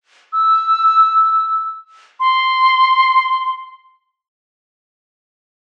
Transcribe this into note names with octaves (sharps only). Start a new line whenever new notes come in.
E6
C6